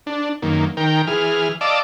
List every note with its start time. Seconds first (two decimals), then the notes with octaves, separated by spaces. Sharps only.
0.07 D4
0.42 F#2 D#3 A#3
0.77 D#3 A#4 G5
1.07 E3 G#4 F6
1.61 D5 D#5 F5 A5 D6 E6